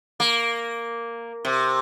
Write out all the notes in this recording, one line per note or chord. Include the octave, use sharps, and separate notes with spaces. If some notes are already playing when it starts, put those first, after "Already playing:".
A#3
C3